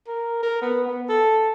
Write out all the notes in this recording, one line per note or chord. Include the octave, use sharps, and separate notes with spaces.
A#4
A#4
B3
B3
A4